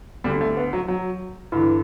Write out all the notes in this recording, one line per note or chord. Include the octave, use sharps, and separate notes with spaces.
D2 D3 G3
A3
B3
F#3
F#3
G2 D3 E3